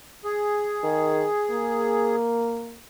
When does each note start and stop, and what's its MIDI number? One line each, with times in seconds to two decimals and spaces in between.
0.24 2.16 68
0.84 1.26 51
1.51 2.81 58